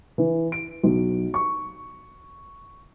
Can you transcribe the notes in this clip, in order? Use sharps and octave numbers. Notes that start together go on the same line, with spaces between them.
E3
D7
B1
C#6